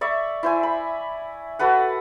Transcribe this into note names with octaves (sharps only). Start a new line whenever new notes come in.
D5 E5 C#6
E4 C5 G#5
B5
F#4 A4 B4 F#5